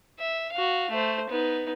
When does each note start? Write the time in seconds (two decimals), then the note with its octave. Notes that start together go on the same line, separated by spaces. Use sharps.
0.20 E5
0.52 F#4 F5
0.90 A3 C5
1.30 B3 D#4